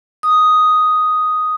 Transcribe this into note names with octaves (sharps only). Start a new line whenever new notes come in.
D#6